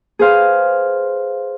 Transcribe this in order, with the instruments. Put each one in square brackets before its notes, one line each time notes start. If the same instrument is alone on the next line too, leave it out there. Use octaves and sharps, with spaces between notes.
[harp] G#4 B4 C5 F5